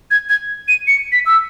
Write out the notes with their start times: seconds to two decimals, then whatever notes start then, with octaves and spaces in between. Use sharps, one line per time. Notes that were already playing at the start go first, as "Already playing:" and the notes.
0.11 G#6
0.29 G#6
0.68 D#7
0.87 C#7
1.12 B6
1.26 E6